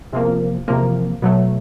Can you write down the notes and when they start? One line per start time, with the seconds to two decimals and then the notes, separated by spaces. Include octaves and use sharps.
0.12 E2 C3 F3 A#3
0.68 E2 C3 F3 A#3
1.22 B2 F#3 A3